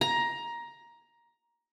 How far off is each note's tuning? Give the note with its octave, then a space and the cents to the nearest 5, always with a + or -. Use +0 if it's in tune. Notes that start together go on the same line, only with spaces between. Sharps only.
A#5 +15